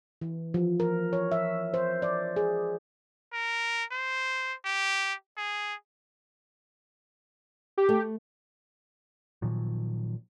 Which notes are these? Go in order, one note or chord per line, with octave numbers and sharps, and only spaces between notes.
E3
F3
A#4
C#5
E5
C5
D5
G#4
A#4
C5
G4
G#4
G4
A3
A#2 D#3 F3 F#3